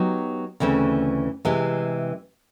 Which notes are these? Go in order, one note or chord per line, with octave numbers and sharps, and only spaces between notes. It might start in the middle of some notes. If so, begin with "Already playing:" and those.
Already playing: F#3 B3 D#4 G4
D2 C#3 E3 A3 C4
C3 E3 G#3